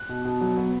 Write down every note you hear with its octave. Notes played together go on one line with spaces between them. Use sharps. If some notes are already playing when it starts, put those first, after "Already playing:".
Already playing: F#6
B2
B2
F#3
B3